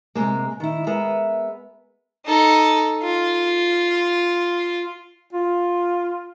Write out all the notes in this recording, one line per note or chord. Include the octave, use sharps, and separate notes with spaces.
C3 G#3 A#3
D#3 E4
G#3 B3 A#4 E5
D#4 A4
F4
F4